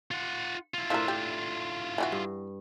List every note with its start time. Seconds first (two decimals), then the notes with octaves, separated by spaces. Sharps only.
0.11 F4 F#5
0.74 E4 F4
0.90 A2 F3 D4 A#4 E5
1.08 G4
1.98 E3 D#4 F#4
2.12 G2